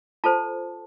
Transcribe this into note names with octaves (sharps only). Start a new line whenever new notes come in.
F4 A4 C5 A5